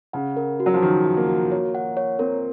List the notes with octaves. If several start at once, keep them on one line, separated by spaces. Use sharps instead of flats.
C#3 F#5
A#4
F#4
F#3
F3
D#3 F#4
F#5
A#3
F#4
C#5
F#5
C#5
C4 A#4